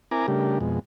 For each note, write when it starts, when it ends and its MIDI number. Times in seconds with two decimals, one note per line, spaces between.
0.11 0.26 60
0.11 0.26 64
0.11 0.26 70
0.11 0.26 80
0.11 0.26 82
0.11 0.26 86
0.28 0.59 49
0.28 0.59 55
0.28 0.59 57
0.28 0.59 62
0.28 0.59 67
0.28 0.59 70
0.61 0.79 41
0.61 0.79 47
0.61 0.79 56